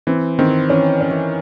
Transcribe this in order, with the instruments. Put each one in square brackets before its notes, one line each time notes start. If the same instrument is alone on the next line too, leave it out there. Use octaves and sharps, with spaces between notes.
[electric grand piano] E3 [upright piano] C4
[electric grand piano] D#3 [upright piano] C4
[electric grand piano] E3 [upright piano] C#4
[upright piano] C#4
[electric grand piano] E3